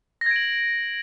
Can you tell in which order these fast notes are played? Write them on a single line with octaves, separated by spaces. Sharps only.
A#6 G#6 D7 F#7